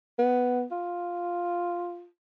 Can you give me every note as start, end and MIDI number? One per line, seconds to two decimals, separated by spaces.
0.19 0.65 59
0.72 2.07 65